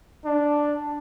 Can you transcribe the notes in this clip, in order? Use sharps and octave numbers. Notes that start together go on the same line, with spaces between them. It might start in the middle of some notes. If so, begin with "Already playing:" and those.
D4